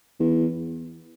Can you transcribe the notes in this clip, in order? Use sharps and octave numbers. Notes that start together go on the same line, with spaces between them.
E2